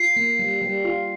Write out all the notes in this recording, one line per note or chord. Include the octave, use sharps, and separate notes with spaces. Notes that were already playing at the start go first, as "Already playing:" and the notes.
Already playing: F4 C7
A#3
G3
G3
F4